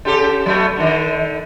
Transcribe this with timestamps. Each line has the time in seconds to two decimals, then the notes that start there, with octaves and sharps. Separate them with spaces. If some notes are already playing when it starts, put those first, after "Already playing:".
0.05 C#3 G4 A4
0.46 F#3 A3 B3
0.76 D3 D#3